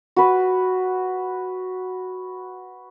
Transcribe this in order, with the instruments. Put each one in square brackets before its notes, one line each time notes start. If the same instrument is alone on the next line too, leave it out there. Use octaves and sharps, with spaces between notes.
[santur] F#4 B4